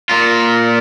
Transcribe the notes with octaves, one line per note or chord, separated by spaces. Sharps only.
A#2 F4